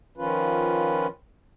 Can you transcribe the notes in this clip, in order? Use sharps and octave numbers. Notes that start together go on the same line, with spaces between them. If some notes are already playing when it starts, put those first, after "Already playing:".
D#3 F3 C#4 F4 B4